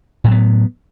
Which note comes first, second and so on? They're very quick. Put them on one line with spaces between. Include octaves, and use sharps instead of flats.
A2 F#3 B3